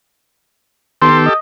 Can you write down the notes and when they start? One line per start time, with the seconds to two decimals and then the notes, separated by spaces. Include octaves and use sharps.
1.02 D#3 B3 G4 A4 C6
1.26 D#5